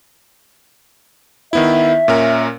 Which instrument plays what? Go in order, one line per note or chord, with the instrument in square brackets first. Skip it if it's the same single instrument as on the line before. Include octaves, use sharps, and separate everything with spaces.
[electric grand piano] D#3 B3 E4 [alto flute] E5
[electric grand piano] A#2 C#4 A#4